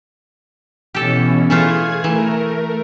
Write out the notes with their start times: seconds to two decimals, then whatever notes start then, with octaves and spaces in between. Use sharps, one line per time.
0.94 B2 E3 C#4 G4 A4
1.50 E3 A3 F4 G#4 G#5
2.04 E3 A3 A#4